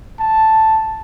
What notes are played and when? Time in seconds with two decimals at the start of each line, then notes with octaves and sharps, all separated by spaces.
0.20 A5